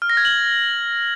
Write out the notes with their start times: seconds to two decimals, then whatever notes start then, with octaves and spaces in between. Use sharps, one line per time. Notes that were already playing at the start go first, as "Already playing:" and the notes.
0.02 F6
0.10 A#6
0.17 G#6
0.25 F#7